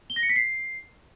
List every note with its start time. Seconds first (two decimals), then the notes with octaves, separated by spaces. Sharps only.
0.10 G7
0.16 A#6
0.23 C#7
0.29 B6
0.36 C7